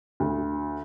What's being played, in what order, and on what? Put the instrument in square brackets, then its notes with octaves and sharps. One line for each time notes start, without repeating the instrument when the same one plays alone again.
[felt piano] D2